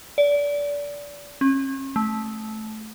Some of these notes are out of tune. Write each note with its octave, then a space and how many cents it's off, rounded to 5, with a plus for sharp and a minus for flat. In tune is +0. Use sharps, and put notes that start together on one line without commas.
D5 -25
C#4 -40
A3 -15